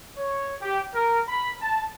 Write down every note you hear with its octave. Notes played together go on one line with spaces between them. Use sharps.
C#5
G4
A#4
B5
A5